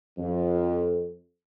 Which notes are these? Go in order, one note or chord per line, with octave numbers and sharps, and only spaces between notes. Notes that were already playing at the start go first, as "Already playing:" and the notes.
F2